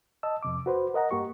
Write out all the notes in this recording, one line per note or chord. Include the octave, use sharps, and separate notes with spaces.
D#5 A5 E6
F2 C3 D6
F#4 B4 C5
A#4 D#5 F#5 A#5
G2 A#3 G4 C#6